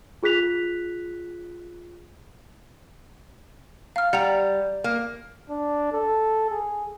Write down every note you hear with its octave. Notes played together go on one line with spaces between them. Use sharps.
F4 G#4 F#6 B6 F7
F5 F6
G3 F#5 A#5 F7
A#3
D4
A4
G#4